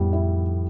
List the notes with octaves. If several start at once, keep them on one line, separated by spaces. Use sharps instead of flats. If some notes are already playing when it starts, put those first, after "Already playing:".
Already playing: F2 A2 G3 B3 E4
E4